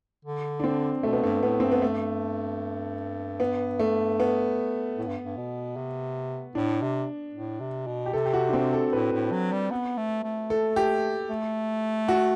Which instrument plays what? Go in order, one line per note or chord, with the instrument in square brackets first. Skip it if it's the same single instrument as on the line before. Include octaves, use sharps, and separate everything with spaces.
[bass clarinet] D3
[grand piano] D4
C4
[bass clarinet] B2 [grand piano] A3
[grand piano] B3
[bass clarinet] G2 [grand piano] A3
[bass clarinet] A2 [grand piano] B3
[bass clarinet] G2 [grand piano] C4
[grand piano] B3
[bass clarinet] G2 [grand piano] A3
[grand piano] B3
A3
B3
[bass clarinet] A2
G2
G2
B2
C3
[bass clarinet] A2 [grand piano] D4
[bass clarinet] C3
A2
C3
B2
[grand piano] G4
[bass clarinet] C3 [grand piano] A4
[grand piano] G4
F#4
D4
C4
A4
[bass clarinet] A2 [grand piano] B4
[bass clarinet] A2
F#3
G3
B3
A3
A3
[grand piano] A4
G4
[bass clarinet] A3
[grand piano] F#4